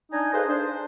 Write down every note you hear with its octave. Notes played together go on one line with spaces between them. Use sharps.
D4 D#4 G#5
G#4 A4 B4 C5 D#5 F5
D4 C5